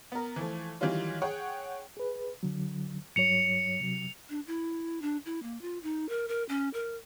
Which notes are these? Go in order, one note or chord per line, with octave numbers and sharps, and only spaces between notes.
B3 A#4
E3 F3 A3
D#3 E3 F#3 G3 C#4 F4
G#4 C#5 F#5 G5
G#4 B4
D3 F#3
G2 F#3 C#5 C#7 F7
C3 F#3
D4
E4
D4
E4
A#3
F4
D#4
A#4
A#4
C#4
A#4